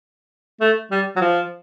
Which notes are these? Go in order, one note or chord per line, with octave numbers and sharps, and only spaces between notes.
A3
G3
F#3
F3